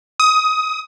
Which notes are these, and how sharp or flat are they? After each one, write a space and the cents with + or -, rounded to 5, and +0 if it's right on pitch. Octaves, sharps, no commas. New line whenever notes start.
D#6 +20